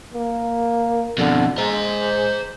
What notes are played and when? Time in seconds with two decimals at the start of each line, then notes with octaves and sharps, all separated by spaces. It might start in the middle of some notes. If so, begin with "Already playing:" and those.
0.14 A#3
1.18 F2 B2 D3
1.58 G#3 C5 A#5